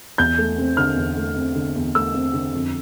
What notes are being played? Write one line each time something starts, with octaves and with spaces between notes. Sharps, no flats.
E2 G6
A3
C4
D3 F6
E2
A3
C4
D3
E2
A3 E6
C4
D3
F2